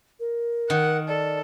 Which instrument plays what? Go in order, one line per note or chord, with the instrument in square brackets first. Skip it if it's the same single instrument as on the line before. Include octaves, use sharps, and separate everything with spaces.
[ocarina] A#4
[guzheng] D#3 [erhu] F#5
[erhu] A4 [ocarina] D5